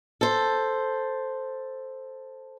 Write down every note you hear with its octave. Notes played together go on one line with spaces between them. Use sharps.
A4 C5